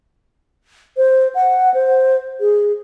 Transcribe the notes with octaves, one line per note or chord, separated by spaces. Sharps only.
C5
F#5
C5
G#4